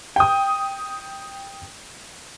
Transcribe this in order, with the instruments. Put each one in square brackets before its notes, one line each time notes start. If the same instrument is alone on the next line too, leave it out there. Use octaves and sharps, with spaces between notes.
[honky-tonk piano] G5 D#6